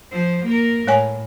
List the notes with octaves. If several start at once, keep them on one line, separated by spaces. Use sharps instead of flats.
F3 C5
A#3 A#4
A2 G#3 C#5 G#5